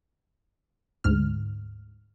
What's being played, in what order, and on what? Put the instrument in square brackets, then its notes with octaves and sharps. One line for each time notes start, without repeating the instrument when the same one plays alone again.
[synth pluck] D2 G#2 F6